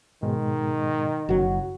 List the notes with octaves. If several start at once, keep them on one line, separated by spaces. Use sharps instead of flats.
G#2 B2 D#3 G#3
F#1 C#3 F#3 F#4